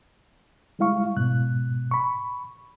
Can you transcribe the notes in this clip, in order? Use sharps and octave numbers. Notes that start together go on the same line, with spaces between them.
G3 G#3 E4 F5 C#6
G#2 B2 F#6
B5 C#6